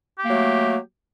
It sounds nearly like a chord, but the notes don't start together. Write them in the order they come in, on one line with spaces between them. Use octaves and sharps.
G4 A#3 F#3 A3